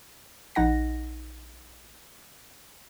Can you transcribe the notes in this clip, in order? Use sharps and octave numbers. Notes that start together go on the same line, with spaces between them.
A#1 D#4 F#5 A#6